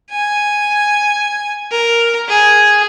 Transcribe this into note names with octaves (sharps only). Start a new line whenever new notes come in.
G#5
A#4
G#4